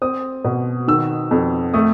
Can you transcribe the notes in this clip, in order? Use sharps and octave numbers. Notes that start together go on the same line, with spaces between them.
C4 D#6
B2
D#3 E6
F2
A3 D#6